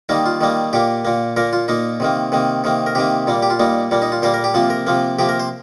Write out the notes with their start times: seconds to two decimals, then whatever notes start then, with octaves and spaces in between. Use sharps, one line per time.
0.09 D#3 G3 A#3 D#4
0.26 F4
0.41 D#3 G3 A#3
0.73 A#2 A#3 G4
1.05 A#2 A#3
1.36 A#2 A#3 A#4
1.53 F4
1.68 A#2 A#3 D#4
2.00 C3 D#3 A#3
2.32 C3 D#3 A#3
2.64 C3 D#3 A#3
2.86 A#4
2.95 C3 D#3 A#3 G4
3.27 A#2 G3 A#3
3.42 G4
3.50 F4
3.59 A#2 G3 A#3 D#4
3.91 A#2 G3 A#3
4.02 D#4
4.12 F4
4.22 A#2 G3 A#3 C5
4.34 A#4
4.44 G4
4.54 C3 F3 A#3 F4
4.70 A#4
4.87 C3 F3 A#3
5.19 C3 F3 A#3 G4
5.29 A#4
5.39 C5